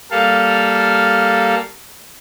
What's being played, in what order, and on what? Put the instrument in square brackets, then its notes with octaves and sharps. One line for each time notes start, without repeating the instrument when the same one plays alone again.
[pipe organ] G3 A#3 A4 F5